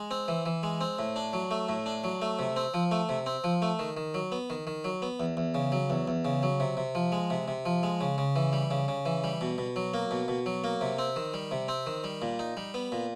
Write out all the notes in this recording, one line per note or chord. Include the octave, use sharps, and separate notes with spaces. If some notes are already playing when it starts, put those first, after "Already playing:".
Already playing: G#3
C4
E3
E3
G#3
C4
A2
D4
F#3
A3
A2
D4
F#3
A3
C3
C4
F3
A3
C3
C4
F3
A3
D#3
D#3
F#3
B3
D#3
D#3
F#3
B3
E2
E2
C#3
F#3
E2
E2
C#3
F#3
C3
C3
F3
G#3
C3
C3
F3
G#3
C#3
C#3
E3
G3
C#3
C#3
E3
G3
B2
B2
F#3
A#3
B2
B2
F#3
A#3
C3
C4
D#3
G3
C3
C4
D#3
G3
A#2
D#4
G3
B3
A#2